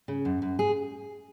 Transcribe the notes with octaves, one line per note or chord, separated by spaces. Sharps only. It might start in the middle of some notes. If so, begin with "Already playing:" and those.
C#3
F#2
F#2
G#4